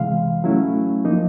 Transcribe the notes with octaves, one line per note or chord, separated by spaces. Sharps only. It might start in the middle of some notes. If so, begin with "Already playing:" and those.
Already playing: C3 E3 G#3 F5
F#3 A3 C#4 E4
F3 A#3 D#4